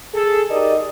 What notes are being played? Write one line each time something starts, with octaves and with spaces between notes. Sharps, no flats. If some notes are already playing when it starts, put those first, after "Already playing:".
G#4 A4
D#4 G4 G#4 A#4 D5 D#5